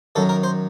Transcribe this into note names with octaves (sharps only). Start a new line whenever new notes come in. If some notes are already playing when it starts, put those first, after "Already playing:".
F#2 D#3 F#3 A4
A#4
C5